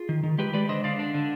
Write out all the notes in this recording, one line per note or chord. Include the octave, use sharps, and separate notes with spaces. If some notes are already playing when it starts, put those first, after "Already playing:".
Already playing: F4 G#4
D#3
D#3
G#3 G4 B4
G#3 B4 D5
D3 C5 D#5
D3 D5 F5
D4
D3